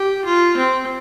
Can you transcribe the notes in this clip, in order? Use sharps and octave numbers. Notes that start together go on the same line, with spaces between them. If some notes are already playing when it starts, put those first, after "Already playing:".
Already playing: G4
F4
C4